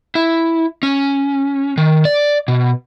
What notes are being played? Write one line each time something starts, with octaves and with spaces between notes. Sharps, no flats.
E4
C#4
D#3
D5
B2